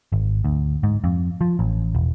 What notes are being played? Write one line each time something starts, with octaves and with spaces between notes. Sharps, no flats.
G#1
D2
G#2
F2
F3
A1
E1